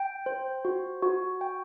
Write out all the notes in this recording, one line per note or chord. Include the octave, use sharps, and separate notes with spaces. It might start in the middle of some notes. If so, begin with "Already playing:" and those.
Already playing: G5
C5
F#4
F#4
G5